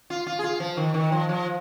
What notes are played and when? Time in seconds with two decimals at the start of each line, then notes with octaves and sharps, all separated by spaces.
0.10 F4
0.27 F4
0.39 G#4
0.44 F4
0.60 F3
0.77 D#3
0.94 D#3
1.12 F3
1.29 F3